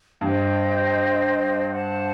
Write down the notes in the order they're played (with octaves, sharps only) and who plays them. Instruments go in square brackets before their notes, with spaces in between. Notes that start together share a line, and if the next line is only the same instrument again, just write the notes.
[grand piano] G2 [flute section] C5 D#5 G5
[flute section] C5 F#5 A5